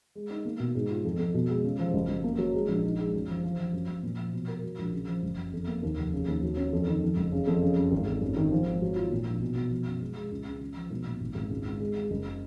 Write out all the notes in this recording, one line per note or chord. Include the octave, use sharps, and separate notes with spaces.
G#3
D#4
A#3
B2
G#2
F4
F2
F2
B2
G#3
C#3
F3
F#1
F#1
A#3
F#3
G#3
A#1
D#4
G#3
F#2
F3
F3
F3
F#2
F#2
A#2
F3
B2
A#4
F#3
A#1
C#3
F3
F#1
F#2
F2
A#3
D#2
F1
C#3
D#2
F#3
C#4
F2
D#3
F2
F#1
C#3
F2
C#3
F#2
G#1
G#1
F#2
D#3
F3
G#1
F#3
F4
A#2
A#1
B2
B2
F3
F#2
G#3
G#3
C#2
C#2
C#3
F3
B1
A#2
G#1
G#1
C#2
C#2
G#3
G#3
F#1